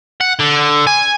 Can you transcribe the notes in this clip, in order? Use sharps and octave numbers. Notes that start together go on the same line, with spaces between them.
F#5
D3
G#5